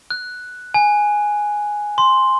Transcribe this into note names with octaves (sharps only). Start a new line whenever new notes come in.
F#6
G#5
C6